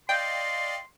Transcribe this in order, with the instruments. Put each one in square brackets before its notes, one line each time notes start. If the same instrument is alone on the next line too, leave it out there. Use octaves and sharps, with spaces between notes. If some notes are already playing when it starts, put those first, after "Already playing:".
[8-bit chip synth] D5 D#5 F5 [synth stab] G5 [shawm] C6